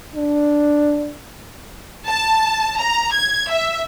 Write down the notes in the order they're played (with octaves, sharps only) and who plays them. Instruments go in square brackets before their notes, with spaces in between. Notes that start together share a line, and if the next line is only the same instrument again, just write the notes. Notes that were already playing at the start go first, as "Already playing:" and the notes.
[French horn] D4
[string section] A5
A#5
G#6
E5